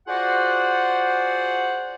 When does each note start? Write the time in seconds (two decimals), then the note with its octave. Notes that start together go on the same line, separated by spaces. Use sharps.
0.08 F4 F#4 G#4 C5 D5 F#5